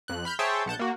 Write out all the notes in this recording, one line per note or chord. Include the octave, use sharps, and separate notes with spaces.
F2 F#6
B5 F6 G6
G#4 C5 C#5 E5 G5 A5
B1 F#5 A5 G6
A#3 F#4